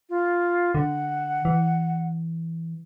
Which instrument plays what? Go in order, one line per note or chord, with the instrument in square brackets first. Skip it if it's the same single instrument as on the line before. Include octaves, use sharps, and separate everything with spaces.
[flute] F4
[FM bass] D3 [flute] F#5
[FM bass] E3